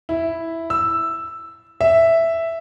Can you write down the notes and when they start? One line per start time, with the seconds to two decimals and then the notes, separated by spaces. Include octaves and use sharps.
0.09 E4
0.70 E6
1.81 E5